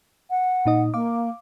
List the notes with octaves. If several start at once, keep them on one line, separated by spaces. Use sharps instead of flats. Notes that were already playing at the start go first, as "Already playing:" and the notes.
F#5
A#2 D#4 D#5
A#3 F5 D6